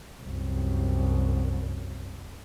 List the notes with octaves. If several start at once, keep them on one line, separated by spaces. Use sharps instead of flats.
C2 F#2